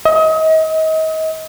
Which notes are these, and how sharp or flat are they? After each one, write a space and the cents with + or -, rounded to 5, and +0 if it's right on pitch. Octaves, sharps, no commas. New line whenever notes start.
D#5 +35